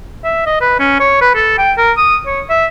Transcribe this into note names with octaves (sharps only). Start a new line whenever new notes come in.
E5
D#5
B4
C#4
C#5
B4
A4
G5
A#4
D#6
C#5
E5